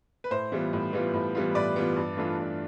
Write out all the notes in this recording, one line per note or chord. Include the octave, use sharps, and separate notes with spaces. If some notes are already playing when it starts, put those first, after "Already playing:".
B4
A2 C5
E3 G3 B3 F4
A2
E3 G3 B3 F4
A2
E3 G3 B3 F4
A2 B4 D5
E3 G3 B3 F4
G2
E3 A3 D4 F4
G2